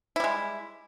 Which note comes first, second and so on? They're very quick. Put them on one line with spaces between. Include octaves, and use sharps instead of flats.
E4 G3 G#3